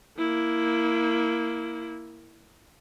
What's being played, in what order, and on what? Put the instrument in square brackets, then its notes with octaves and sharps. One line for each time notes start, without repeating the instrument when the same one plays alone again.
[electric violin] A#3 E4